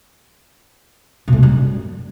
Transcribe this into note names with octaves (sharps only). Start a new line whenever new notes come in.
B2
A3
C3
G3
F#2